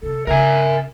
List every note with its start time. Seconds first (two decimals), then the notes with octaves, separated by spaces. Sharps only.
0.03 C3 A4
0.27 C#3 A#4 E5 G#5